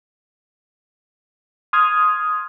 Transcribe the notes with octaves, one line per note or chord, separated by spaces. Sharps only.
C6 D#6 F6 G#6